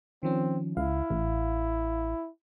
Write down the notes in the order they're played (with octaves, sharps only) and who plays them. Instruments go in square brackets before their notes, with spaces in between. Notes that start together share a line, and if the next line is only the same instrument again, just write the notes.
[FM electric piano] D#3 F3 C#4 [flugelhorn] C4
[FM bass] C#2 [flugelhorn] E4 [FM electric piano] F5
[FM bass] A1